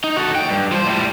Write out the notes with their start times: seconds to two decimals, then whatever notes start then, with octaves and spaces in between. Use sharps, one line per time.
0.04 D#4
0.17 F#4 A4
0.35 D#2 G5
0.50 G2
0.72 F3 C5
0.86 A2 G3